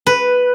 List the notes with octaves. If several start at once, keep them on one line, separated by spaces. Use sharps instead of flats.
B4